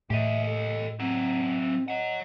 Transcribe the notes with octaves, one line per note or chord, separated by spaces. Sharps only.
A2 G4 D#5 E5
A4
F#3 C4 E4
C#5 D#5 F#5